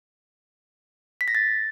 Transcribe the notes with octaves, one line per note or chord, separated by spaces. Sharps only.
B6
A#6
A6